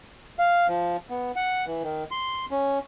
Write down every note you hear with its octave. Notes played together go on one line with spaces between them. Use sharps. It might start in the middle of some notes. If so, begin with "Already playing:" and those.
F5
F3
B3
F#5
E3
D#3
C6
C#4